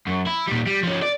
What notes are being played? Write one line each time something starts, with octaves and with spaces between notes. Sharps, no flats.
F#2
E4
A#2 G3
G3
F3 C#4
D5